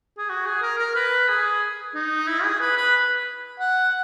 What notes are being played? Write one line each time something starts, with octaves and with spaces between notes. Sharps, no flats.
G#4
F#4
G#4
A#4
A#4
B4
G#4
D#4
E4
G#4
B4
B4
F#5